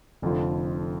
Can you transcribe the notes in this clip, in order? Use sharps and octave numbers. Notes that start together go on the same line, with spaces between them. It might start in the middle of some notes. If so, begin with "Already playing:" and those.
F1 F2 D3 F3